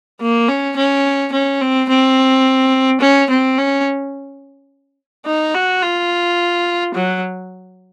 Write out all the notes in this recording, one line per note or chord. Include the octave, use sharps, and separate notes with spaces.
A#3
C#4
C#4
C#4
C4
C4
C#4
C4
C#4
D#4
F#4
F4
F#3